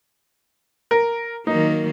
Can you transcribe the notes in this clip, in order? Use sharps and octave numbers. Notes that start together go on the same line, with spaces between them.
A#4
D#3 F#3 A#3 D#4